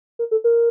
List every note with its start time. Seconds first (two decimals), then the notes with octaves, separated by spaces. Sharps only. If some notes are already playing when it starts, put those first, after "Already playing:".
0.19 A#4
0.31 A4
0.44 A#4